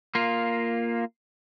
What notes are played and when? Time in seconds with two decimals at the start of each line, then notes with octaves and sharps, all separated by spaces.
0.15 A#3 F4